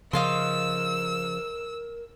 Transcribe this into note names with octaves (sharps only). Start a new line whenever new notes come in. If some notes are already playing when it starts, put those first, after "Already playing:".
C#3 F3 A#4 D#5 F5 C6 E6